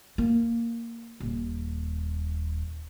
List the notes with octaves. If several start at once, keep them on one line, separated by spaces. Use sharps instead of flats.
A#3
D#1